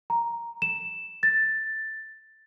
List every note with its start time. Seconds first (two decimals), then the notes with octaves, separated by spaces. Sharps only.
0.10 A#5
0.62 E7
1.23 A6